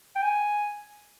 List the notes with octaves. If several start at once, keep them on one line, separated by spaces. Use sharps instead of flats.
G5
G#5